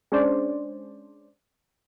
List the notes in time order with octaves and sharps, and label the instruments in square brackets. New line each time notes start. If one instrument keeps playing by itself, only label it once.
[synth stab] G#3 C#4 D4 C5 D5